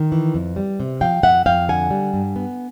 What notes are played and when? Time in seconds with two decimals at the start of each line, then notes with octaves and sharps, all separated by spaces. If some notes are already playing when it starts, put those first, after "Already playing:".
Already playing: D#3
0.12 E3
0.35 F2
0.56 G3
0.80 C3
1.01 F3 F5 G5
1.23 F2 E5 F#5
1.46 F2 F5 G5
1.69 D3 F#5 G#5
1.91 G3
2.14 G2
2.36 B3